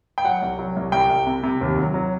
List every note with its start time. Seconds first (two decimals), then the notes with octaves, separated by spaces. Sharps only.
0.18 G5
0.25 F#3 F#5
0.42 C2
0.59 F#3
0.76 C2
0.92 C2 G5
1.10 C2
1.27 C3
1.43 C3
1.61 D#2
1.78 F#3
1.94 F#3